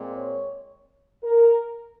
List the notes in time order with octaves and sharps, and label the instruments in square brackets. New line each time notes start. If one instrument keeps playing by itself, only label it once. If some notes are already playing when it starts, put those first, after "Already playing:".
Already playing: [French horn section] A#2 G#3 C4
C#5
A#4